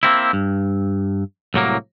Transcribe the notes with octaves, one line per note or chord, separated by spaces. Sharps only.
A#3 C4 E4
G2
C2 A2 F#3 A#3